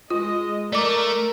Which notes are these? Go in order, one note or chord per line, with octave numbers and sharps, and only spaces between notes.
G#3 F4 D#5
A3 A#4 D5 D6